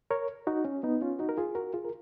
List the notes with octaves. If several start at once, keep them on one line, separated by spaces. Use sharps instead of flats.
A#4 C#5
D#4 F#4
C#4
B3 D#4
C#4 F4
D#4 F#4
A#4
F4 G#4
F#4 A#4
F4 G#4
A#4